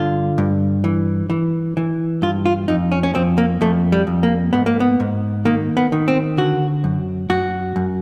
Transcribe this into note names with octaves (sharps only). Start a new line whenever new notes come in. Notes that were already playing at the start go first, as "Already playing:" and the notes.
Already playing: G2 D3 F4
G2
E3
E3
E3
G2 F4
F4
F2 D#4
C#4
C#4
F2 C4
A#3
F2 A3
G3
F2
A#3
G#2 B3
A#3
B3
G#2
D#3 A#3
B3
D#3
C4
D3 F#4
F#2
F#2 F#4
F#2